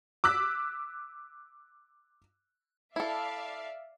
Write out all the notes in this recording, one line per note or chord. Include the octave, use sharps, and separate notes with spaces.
D6 E6 F#6 B6
E4 A4 D5 E5 F5